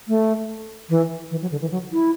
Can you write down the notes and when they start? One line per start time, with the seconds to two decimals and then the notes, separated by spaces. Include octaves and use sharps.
0.08 A3
0.90 E3
1.31 E3
1.42 F#3
1.52 D3
1.61 E3
1.71 F#3
1.92 E4